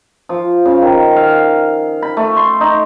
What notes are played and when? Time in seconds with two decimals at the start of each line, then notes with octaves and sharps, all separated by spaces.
0.29 F3
0.66 C#3
0.82 D#3
1.16 F5
2.02 B5
2.17 A3
2.37 C6
2.61 D#4